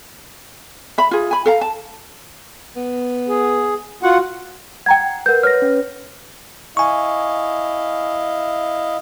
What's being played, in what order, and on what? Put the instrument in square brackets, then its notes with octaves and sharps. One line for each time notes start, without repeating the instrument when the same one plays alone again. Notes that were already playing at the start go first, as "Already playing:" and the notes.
[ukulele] E5 B5
F4 G#4
G#5 B5
A4 F5 A#5
A5
[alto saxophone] B3
[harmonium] G#4
[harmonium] F4 F#5 [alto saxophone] F#4
[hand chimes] F#5 [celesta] G5 A#5 G#6
[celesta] A#4 G6 [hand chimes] B4 F#5
[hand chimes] B4 C#5 [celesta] F6 A#6
[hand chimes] C#4
[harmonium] E4 D#5 F5 [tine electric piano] G#5 C#6